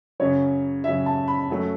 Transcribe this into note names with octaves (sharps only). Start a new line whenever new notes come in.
F#2 C#3 F#3 C#5
F#2 C#3 F#3 E5
A5
B5
F#2 F#3 A3